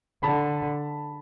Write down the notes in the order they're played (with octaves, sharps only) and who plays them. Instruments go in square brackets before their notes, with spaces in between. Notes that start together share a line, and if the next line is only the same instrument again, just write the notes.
[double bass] D3 [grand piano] A5 B5